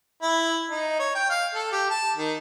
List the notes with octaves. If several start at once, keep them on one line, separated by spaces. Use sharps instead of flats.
E4
D#4
C#5
G5
F5
A4
G4
A5
D#3